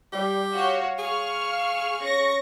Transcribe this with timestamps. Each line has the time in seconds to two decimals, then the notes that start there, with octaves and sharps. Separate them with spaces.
0.13 G3 G4
0.52 F#4 C#5 F5
0.99 G#4 C#6 F6
1.47 F5
2.01 C#4 C#6 A#6